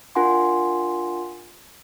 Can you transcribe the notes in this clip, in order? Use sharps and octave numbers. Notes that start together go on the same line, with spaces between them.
D4 F4 A#4 F#5 G#5 C6